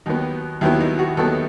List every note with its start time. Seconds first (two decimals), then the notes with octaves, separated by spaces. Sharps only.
0.06 D#2 D#3 F#3 B3 D#4
0.61 D#2 D#3 F#3 B3 E4
0.80 D#4
0.99 F#4
1.17 D#2 D#3 F#3 B3 A4